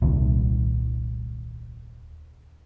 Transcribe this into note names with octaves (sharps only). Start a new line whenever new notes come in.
D#1 C2 D#3